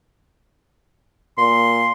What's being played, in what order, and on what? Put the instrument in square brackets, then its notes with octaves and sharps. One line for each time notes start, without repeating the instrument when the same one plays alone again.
[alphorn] A#2 [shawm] C6